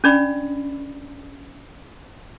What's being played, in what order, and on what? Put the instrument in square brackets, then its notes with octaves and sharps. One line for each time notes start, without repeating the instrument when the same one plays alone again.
[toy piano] C#4 D4 D5 B5